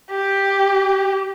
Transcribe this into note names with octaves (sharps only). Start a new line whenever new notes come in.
G4